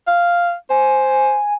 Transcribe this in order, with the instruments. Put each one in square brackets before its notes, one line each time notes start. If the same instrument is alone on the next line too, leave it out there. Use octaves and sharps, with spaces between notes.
[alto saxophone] F5
[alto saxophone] C5 [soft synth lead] G#5